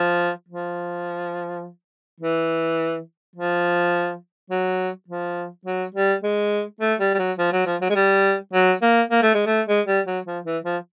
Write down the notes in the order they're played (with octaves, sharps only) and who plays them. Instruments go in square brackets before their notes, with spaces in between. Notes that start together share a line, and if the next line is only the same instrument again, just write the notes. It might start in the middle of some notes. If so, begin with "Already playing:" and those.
Already playing: [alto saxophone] F3
F3
E3
F3
F#3
F3
F#3
G3
G#3
A3
G3
G3
F#3
F3
F#3
F3
F#3
G#3
G3
F#3
A#3
A#3
A3
G#3
A3
G#3
G3
F#3
F3
E3
F3